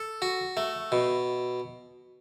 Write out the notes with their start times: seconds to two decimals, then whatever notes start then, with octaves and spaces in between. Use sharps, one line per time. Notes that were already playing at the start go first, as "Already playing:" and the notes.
Already playing: A4
0.22 F#4
0.57 A3
0.92 B2